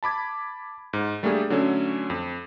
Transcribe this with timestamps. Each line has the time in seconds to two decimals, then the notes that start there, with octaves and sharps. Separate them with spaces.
0.03 A5 B5 D6 G#6
0.93 G#2
1.23 G3 A3 A#3 D4 G4 G#4
1.50 D3 F#3 A3 C#4
2.10 F2